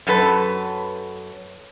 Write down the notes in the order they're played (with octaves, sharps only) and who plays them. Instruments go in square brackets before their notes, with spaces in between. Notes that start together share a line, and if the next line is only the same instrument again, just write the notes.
[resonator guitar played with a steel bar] F#2 F#3 A4 B4